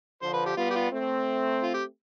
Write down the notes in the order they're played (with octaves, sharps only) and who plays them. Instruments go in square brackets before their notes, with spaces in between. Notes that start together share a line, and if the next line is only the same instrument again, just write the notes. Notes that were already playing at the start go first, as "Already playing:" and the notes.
[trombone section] D3 F3 [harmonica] C5
[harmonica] B4
G4
[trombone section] G3 B3 [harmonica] F4
[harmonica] G4
F4
[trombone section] A3 C4
[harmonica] F4
G4